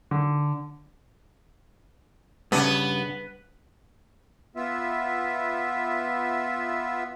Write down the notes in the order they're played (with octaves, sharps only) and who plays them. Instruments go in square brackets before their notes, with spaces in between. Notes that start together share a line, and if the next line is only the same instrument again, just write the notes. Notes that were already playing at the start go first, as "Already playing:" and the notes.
[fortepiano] D3
[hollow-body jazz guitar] G2 C#3 [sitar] B3
[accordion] B3 F4 E5